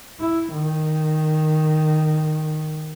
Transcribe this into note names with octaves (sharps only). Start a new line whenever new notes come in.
E4
D#3